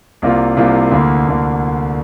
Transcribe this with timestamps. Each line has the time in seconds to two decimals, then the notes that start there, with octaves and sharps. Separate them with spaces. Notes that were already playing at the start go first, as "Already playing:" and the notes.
0.22 C2 C3 A#3 F4
0.57 C2 C3 A#3 F4
0.91 D2 D3 A#3
1.27 D2 D3 A#3